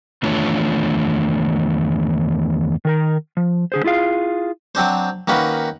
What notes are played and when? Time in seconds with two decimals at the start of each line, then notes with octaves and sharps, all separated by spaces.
0.23 E2 D#3 A3 D4 F4 C#5
2.85 D#3 A#4 A#5
3.37 F3
3.72 D3 G#4 C5
3.84 E4 F4 G#4 F5
4.75 F#3 C4 D4 C5
5.28 D#3 A#3 C#4 F#4 B4